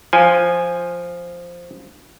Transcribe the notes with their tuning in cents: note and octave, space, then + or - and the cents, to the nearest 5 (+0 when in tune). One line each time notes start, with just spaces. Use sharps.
F3 +0 G#5 +0